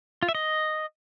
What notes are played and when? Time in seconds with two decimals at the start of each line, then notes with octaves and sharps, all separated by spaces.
0.23 F4
0.29 E5
0.35 D#5